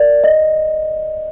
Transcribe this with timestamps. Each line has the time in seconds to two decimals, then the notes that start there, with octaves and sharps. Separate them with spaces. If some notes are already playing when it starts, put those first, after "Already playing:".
Already playing: A#4 D5
0.24 D#5